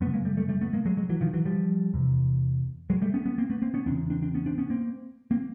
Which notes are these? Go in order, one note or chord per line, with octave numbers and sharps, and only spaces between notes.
F#2 A3 B3
C#3
G#3 A#3
G3 A3
G3 A3
G3 A3
A3 B3
G#3 A#3
F#3 G#3
F#3 G#3
E3 F#3
D#3 F3
E3 F#3
F3 G3
E2 C3
F#3 G#3
G3 A3
B3 C#4
B3 C#4
A#3 C4
A3 B3
A#3 C4
B3 C#4
E2 C#3 C4 D4
C4 D4
C4 D4
B3 C#4
C4 D4
B3 C#4
A#3 C4
A#3 C4